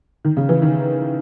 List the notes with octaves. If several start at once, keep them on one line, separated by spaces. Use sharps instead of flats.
D#3
C#3
E3
D#3